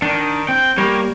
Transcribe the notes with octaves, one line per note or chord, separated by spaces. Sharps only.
D#3 D4
C4 G5
G3 A#3 G4 C#5